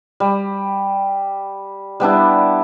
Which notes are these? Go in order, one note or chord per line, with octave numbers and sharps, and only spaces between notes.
G3
G3 B3 D4 E4